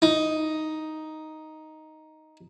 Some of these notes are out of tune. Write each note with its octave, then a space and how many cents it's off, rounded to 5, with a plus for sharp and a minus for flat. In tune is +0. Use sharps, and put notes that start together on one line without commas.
D#4 +5